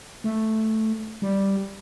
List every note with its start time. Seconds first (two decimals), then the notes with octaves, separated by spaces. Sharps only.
0.24 A3
1.22 G3